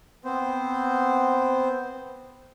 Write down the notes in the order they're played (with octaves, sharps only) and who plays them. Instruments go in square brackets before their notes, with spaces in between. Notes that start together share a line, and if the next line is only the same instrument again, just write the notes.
[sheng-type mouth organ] B3 C4 C5